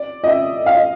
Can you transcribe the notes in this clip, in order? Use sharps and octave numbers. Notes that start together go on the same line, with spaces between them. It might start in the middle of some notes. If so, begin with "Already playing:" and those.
Already playing: D5
D#5
E5
F5
D#5